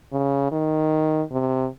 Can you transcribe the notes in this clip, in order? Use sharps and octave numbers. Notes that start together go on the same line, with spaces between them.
C#3
D#3
C3